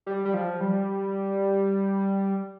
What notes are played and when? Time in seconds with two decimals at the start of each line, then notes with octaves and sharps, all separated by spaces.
0.06 G3
0.25 G3
0.34 F3
0.60 G3